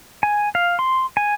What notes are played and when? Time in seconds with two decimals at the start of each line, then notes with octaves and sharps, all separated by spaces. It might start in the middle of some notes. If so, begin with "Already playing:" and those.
0.23 G#5
0.55 F5
0.79 C6
1.17 G#5